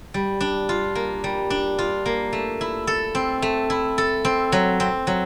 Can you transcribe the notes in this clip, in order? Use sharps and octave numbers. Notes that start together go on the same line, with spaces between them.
G3
D4
F4
A#3
G3
D4
F4
A#3
A3
E4
A4
C4
A3
E4
A4
C4
F#3
C4
F#3